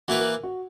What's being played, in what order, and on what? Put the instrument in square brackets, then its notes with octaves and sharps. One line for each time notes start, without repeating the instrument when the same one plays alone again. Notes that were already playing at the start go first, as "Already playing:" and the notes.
[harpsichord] E3 A#3 E4 B4 [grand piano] F#4
[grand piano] A#4
F#4